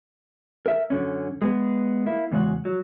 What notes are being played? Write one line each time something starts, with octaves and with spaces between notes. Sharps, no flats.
A#4 E5
F#2 D3 C#4
G#3 B3
A#3 E4
E2 C#3 G#3 F4 F#4
F#3